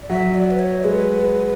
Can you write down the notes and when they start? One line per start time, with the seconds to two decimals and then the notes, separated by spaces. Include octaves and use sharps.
0.02 D5
0.10 F#3 E5
0.35 D5
0.51 B4
0.59 C#5
0.84 G#3 B4